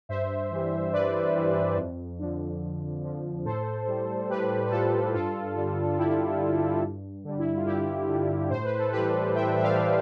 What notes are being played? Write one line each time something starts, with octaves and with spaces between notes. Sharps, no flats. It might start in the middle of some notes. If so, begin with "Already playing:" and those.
G2 C5 E5
E3 G3
G2 B4 D5
E3 G3
F2
D3 F3
F2
D3 F3
A2 A4 C5
G3
A2 G4 B4
B4
G3 F4 A4
G2 F4 A4
D3 G3
G2 E4 G4
D3 G3
G2
D3 G3
E4
F4
G2 E4 G4
D3 G3
A2 C5
B4
A4
E3 G3 G4 B4
A2 E5 G5
E5
D5 F5
E3 G3